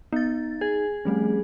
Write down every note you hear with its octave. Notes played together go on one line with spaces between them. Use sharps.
B3 D#4 A6
G#4
F3 G3 A3 C4 C#4